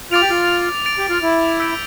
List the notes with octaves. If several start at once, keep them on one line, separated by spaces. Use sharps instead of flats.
F4 D6 A6 D7 F7
G4
F4
A6 D7 F7
G4
F4
E4
E6 G6 B6 D7